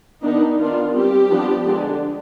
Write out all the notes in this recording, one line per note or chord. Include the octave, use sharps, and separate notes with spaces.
D#3 B3 D4 D#4
D#3 B3 D4 F4
G3 C4 G4
F3 B3 D4
D3 G#3 D4